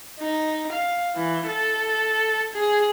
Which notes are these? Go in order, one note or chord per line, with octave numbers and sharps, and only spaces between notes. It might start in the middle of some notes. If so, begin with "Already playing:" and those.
D#4
F5
E3
A4
G#4